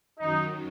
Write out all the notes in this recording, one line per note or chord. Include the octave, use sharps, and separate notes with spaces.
F#2 D#3 F#3 D#4